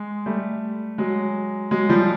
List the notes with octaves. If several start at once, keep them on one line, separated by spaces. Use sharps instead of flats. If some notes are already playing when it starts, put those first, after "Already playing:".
Already playing: G#3
G3 A3
F#3 G#3
F#3 G#3
F3 G3